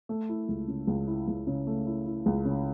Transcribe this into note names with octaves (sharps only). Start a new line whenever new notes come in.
A3
E4
C#2
C#3
C#2
E4
C#2
C#3
A3
E4
E4
C#2
C#3